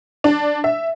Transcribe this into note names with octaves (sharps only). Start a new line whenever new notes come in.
D4
E5